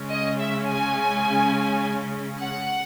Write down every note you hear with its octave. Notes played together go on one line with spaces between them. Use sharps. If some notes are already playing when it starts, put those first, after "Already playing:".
Already playing: C#3 G#3 C#4
D#5
E5
G#5
F#5